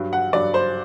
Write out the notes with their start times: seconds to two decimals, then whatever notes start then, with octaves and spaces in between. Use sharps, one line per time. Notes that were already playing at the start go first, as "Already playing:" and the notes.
Already playing: G2 F#3
0.13 F#5
0.33 G2 F#3 D5
0.54 C5